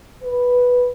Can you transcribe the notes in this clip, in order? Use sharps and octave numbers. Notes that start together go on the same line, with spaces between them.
B4